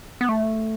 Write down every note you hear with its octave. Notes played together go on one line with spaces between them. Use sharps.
B3
A3